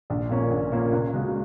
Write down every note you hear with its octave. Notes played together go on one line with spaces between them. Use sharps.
A#1
A#2 A#3 C#4
A#1
A#2 A#3 C#4
C#2
C#3 G#3 F#4